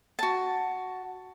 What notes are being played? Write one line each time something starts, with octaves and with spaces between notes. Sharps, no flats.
F#4 A5